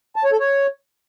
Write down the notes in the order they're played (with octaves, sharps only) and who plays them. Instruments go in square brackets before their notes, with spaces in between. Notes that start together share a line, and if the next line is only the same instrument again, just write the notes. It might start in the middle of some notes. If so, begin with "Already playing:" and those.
[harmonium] A5
C#5
A4
C#5